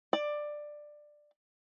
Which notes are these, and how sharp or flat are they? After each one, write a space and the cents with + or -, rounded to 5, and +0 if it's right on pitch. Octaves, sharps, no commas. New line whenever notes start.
D5 +15